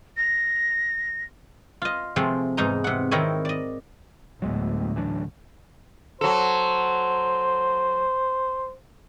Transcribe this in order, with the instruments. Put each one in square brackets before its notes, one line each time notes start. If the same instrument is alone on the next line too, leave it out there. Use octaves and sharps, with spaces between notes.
[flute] A#6
[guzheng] F4 D#5
C3 F3 G#3 A3 C4
E2 G#2 D#4 A#5
C3 F#5
D#3 C4 D#4 E4 C#5 D#5
D5 D#5
[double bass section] D2 A2 [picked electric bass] F#3 G#3 B3
[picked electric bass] E3 F#3 D4
[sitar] F#3 A4 [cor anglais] C5